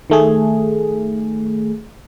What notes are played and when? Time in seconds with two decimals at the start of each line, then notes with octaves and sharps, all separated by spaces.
0.10 D#3 A3 G#4